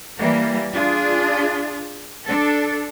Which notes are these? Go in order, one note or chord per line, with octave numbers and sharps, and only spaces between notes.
E3 G3 A#3
D4 F4 G#4
D4 A4